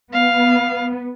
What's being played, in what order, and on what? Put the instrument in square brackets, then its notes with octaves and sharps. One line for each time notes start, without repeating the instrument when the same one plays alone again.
[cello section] B3 [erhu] F5